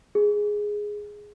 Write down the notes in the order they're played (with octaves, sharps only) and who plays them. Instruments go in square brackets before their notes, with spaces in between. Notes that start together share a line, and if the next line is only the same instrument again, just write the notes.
[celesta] G#4